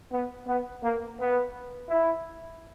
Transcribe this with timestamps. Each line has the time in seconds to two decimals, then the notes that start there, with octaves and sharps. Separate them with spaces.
0.12 B3
0.47 B3
0.83 A#3
1.19 B3
1.89 E4